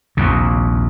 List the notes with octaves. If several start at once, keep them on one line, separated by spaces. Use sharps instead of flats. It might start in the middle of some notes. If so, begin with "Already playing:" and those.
A#1 D#2 C3